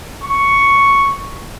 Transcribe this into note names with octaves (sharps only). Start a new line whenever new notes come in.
C#6